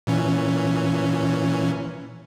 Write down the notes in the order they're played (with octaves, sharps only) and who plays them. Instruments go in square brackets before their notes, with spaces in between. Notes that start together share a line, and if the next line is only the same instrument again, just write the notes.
[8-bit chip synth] A#2 E3 C#4